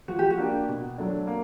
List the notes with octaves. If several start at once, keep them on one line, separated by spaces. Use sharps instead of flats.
F3 F#4
G4
F#4
A#3 D4 G4
B2
F#3 A3 D4
A#3